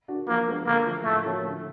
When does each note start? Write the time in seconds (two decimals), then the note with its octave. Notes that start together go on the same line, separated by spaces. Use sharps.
0.08 D4 F#4
0.28 F3 A#3
0.47 G#3 B3 D4
0.66 D3 A#3
0.86 F3 A3
1.05 A2 A3
1.24 F3 A#3 C#4 F#4
1.44 D3